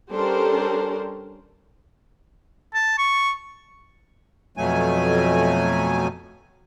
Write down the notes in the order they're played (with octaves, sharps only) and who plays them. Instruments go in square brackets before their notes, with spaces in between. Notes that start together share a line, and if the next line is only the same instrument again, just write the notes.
[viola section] G3 C#4 D4 A4 A#4 C5
[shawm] A5
C#6
[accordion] F2 B2 F#3 A3 G#5